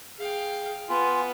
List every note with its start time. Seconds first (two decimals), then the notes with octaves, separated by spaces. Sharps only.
0.19 G#4 F5 G5
0.89 B3 F4 G#5